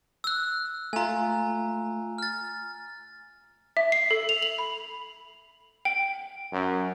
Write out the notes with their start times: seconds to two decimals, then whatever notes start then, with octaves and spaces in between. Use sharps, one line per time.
0.24 E6 F#6
0.93 A3 F4 G#5 A#5
2.18 F6 A6
3.77 E5
3.92 C7
4.11 A4
4.29 F7
4.42 F#7
4.58 B5
5.85 G5
6.53 F#2